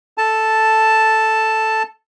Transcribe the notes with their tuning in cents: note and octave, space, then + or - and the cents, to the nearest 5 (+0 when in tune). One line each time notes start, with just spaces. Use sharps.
A4 +0 A5 +0